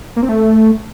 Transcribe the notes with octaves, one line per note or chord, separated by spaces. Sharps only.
A#3
C4
A3